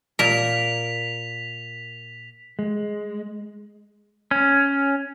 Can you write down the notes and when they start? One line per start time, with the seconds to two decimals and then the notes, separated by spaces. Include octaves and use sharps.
0.19 A#2 A#4 B6 F7
2.59 G#3
4.31 C#4